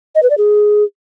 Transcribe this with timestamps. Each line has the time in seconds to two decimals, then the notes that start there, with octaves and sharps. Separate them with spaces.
0.15 D#5
0.23 B4
0.30 D5
0.38 G#4